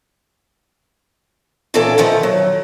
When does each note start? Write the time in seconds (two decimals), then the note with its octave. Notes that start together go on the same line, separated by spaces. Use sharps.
1.74 A#2 D#3 E3 C#4 A4 D5
1.98 D#3 F3 A3 F4 F#5
2.23 F#3